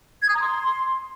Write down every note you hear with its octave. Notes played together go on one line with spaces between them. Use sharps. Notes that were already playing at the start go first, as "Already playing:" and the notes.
G#6
D#6
A#5
C6